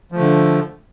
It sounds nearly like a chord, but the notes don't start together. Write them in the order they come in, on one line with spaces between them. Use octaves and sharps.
F3 A3 D3